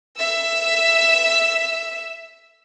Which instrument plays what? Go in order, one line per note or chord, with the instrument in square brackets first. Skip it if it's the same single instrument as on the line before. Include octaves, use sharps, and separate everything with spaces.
[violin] E5 E6